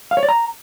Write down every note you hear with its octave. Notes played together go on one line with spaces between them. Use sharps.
F5
C#5
D5
A#5